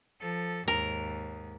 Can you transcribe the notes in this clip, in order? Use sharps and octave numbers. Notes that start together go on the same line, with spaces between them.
F3 A4
D#2 G#2 A#4